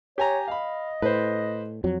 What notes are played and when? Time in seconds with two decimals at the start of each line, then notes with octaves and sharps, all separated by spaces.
0.18 G4 C#5 G#5 A#5
0.48 D#5 F5 B5
1.02 A2 B4 C5
1.84 F2 F#3